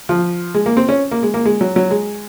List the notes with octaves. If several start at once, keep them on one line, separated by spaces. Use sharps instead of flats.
F3
G#3
A#3
C4
C#4
A#3
G#3
A#3
G#3
F#3
F#3
G#3